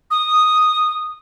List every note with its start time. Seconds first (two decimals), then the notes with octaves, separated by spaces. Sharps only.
0.11 D#6